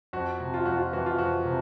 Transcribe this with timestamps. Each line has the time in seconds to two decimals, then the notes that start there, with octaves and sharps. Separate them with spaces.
0.13 F2 F#4
0.40 C3
0.54 F4
0.65 F2 F#4
0.77 F4
0.93 E3 F#4
1.06 F4
1.18 F2 F#4
1.45 C3